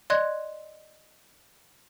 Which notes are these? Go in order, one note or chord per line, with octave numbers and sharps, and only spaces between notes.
D5 D#5 C6 F#6 G#6